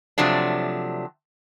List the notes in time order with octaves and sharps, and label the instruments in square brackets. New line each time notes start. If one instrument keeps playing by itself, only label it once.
[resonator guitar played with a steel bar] C3 F3 F#3 A3 D4